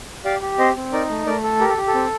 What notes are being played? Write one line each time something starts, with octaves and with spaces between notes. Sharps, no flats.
G4 D5 F5
G4
C4 C5 D#5
C4
D#4 A#4 D5
A3
A3 A#4 D5
A4
G4 A#4
A4
G4
A4
C4